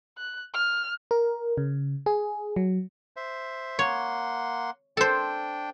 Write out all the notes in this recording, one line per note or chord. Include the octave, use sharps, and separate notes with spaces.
F#6
F6
A#4
C#3
G#4
F#3
C5 E5
A#3 C#5 F#5 C6
D4 A4 C5 G5